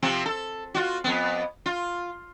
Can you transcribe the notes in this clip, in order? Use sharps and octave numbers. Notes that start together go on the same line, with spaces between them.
C3 F3 C4
A4
F4 F#4
F2 B3
F4